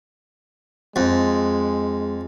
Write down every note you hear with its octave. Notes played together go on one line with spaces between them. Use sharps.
F2 G#3